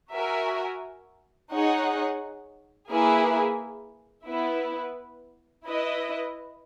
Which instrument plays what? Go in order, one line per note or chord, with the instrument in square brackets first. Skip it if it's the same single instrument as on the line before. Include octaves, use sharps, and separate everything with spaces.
[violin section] F#4 A#4 E5 G#5
D#4 G#4 C#5 F#5
A#3 E4 G#4 B4
B3 E4 B4
E4 B4 D#5